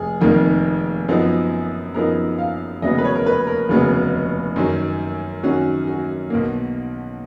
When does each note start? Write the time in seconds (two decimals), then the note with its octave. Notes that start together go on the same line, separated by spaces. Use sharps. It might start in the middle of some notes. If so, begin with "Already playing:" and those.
Already playing: F1 G#4
0.21 F1 F2 D#3 A#3
1.09 F#2 F3 B3 D#4
1.94 F#2 F3 B3 D#4 A#4
2.38 F5
2.82 F1 D#2 C#3 F#3 B3 D#5
2.98 B4
3.05 C#5
3.15 A#4
3.26 B4
3.47 A#4
3.69 F1 D#2 C#3 F#3 B3
4.56 F#2 D#3 F#3 C#4
5.43 F#2 D#3 F#3 C#4 F#4
5.87 F#4
6.30 B1 B2 A#3